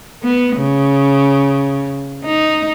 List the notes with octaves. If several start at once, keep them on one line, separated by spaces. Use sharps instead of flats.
B3
C#3
D#4